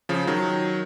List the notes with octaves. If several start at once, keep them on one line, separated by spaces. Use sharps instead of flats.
C#3 F3
D#3 F#3